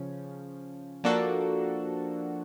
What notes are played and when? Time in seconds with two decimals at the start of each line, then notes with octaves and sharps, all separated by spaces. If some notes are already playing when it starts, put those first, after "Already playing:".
Already playing: C#3 F3 C#4
1.04 F3 A#3 D4 F#4 A4